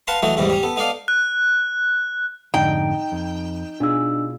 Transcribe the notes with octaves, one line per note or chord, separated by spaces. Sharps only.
B4 F5 F#5 A5 A#5 C6
E3 F#3 A3 D#4 F#4
D#2 G#2 C3 E3 G3
G3 C#4
B3 A4
B3 D#4 A4 D5 F5
F#6
F2 G#2 D3 D#4 G5
F2
B2 D4 F4 G#4 E6